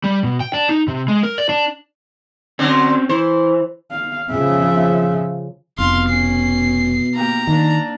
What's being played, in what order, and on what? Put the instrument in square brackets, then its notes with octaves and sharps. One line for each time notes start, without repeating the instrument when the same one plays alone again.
[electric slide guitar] G3
B2
G5
D4
D#4
C3
G#3
A#4
D5
D4
[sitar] D3 F#3 [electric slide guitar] C4 C#4
[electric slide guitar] E3 [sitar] C5
[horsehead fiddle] F5
[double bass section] C#3 F3 [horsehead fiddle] E5
[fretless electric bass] F1 [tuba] B2 [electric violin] F5 C6
[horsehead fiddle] C#4 [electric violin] C7
[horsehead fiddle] A#3 G4 [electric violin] A#5
[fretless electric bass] D#3 [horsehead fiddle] A#3 D4